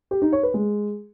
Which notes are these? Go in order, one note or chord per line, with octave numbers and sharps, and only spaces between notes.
G4
D#4
C#5
B4
G#3